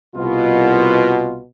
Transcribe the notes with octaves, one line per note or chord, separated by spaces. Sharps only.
C2 B2 F4